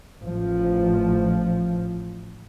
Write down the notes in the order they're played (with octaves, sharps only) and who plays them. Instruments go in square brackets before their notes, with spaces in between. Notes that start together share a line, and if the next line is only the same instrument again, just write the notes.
[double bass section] A1 F3